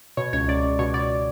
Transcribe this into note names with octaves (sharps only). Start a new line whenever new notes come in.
B2 C#5
C#2 C#5
C#2 D5
C#2
B2 C#5
B2 D5